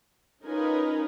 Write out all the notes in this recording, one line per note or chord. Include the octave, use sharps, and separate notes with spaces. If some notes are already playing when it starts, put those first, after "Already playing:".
C#4 D#4 F4 A#4 B4 G#5